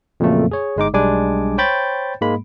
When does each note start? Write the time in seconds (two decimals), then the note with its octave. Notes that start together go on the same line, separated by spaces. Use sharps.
0.20 F2 A#2 C#3 F#3 A3 A#3
0.51 G#4 C#5
0.76 G1 G#3 D#4 D6
0.93 B1 G3 G#3 D4 G#5 D6
1.58 C5 C#5 G5 B5 G6 A6
2.21 G#2 G#3 A#3 B5